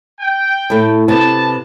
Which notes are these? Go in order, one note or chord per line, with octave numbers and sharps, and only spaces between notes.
G5
A2 A3
C3 B3 A5